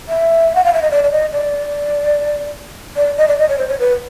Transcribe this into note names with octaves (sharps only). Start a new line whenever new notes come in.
E5
F#5
F5
E5
D#5
D5
D5
D#5
D5
D5
D#5
D5
D#5
C#5
C5
C#5
B4